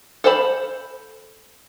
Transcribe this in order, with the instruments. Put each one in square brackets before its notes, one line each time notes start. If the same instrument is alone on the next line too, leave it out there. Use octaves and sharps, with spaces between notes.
[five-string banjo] A4 C5 A5 B5